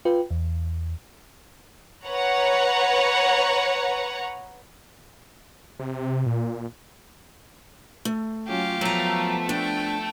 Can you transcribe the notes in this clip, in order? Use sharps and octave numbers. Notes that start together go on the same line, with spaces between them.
F4 B4 G5
E2
B4 C#5 F#5 A#5
C3
A#2
A3
F#3 C#4 F4 G4 F5
F3 F#3 A3 B3 A#5
D4 G5